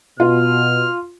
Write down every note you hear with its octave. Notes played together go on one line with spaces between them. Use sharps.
B2 F4 F6